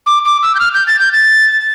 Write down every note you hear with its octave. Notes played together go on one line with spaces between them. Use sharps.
D6
D6
E6
G6
F6
G6
A6
G6
A6